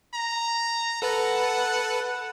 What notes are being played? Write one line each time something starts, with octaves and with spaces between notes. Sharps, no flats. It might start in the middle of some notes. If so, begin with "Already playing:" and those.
A#5
A4 B4 F#5 A5